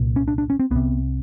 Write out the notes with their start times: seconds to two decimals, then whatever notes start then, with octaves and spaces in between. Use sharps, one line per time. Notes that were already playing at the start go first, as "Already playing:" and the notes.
Already playing: C2 A#2
0.16 C#4
0.28 D4
0.38 D4
0.50 C#4
0.60 C4
0.71 C2 C3 B3